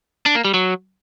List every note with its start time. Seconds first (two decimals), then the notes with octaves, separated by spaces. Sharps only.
0.26 D4
0.35 A#3
0.45 G3
0.54 F#3